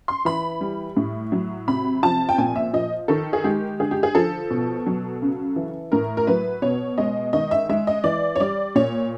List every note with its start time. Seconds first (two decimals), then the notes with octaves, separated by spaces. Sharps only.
0.08 C6
0.25 E3 B5
0.61 G3
0.97 A2
1.32 F#3
1.68 C3 B5
2.03 F3 A5
2.29 G5
2.38 A#2 G#5
2.56 E5
2.73 F3 D#5
3.08 D#3 A4
3.33 G#4
3.44 G#3 G4
3.80 D3 G#4
3.91 G4
4.03 G#4
4.15 F3 A4
4.51 B2
4.86 F#3
5.22 C#3
5.56 E3
5.92 A2 A#4
6.17 A#4
6.27 F#3 B4
6.62 B2 C#5
6.98 G#3 D#5
7.33 D#3 D#5
7.51 E5
7.69 G#3 E5
7.87 D#5
8.04 E3 D5
8.36 C#5
8.40 G3 D5
8.75 A#2 C#5